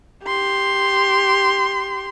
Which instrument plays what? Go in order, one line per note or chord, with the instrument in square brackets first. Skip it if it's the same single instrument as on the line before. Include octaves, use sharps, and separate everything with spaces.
[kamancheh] G4 C6